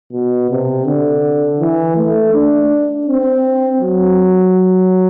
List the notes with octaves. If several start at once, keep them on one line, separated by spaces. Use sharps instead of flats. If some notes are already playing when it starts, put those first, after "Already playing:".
B2
C3
D3
E3
A3
D4
C4
F#3